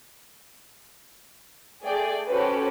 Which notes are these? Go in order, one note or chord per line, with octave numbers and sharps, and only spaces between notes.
A3 G#4 D5 G5
C#4 F#4 G4 A4 B4 C5